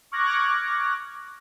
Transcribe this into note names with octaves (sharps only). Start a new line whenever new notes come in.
C#6 D6 F6 F#6 G#6 A#6